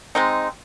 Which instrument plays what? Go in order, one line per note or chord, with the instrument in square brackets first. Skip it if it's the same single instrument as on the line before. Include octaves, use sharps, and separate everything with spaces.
[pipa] G#3 C4 D#4